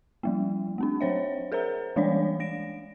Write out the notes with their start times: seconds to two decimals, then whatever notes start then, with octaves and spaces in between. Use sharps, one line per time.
0.23 F3 G3 A#3
0.78 A3 C4 D4
1.01 F#3 C5 C#5 E5
1.52 G#4 A#4 C5 E5 A#5
1.96 E3 G3 G#3 D4 C#5 D5
2.40 G#3 A#6 D7